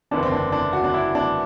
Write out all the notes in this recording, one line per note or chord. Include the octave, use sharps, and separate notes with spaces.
F#1 E2 D3 D4
C4
D4
D4
F#4
D4
E4
D4